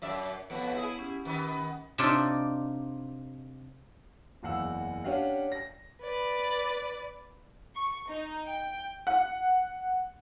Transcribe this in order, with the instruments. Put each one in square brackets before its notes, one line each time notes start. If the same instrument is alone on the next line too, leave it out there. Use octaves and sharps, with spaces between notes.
[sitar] F#2 D5 E5
[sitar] F2 B2 F#4 [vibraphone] B3 B4 C#5
[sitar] E4 G#4
[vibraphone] C#4 G4
[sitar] D#3 B3
[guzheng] C3 D4 D#4 F4 D5
[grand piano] F#1 E2 F5 F#5 E6
C#4 D4 G4 F5 F#5
A#6
[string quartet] B4 D5
[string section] C#6
D#4
G5
[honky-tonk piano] F#5